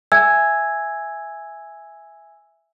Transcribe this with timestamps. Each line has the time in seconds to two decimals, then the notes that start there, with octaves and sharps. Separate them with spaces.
0.12 E5 G#5 E6 G#6